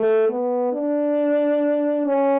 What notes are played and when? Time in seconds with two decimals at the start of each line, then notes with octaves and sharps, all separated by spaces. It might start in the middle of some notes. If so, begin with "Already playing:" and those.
Already playing: A3
0.29 B3
0.73 D4
2.06 C#4